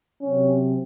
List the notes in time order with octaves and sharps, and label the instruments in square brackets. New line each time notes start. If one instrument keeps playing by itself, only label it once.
[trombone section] C3 F#3 C4 C#4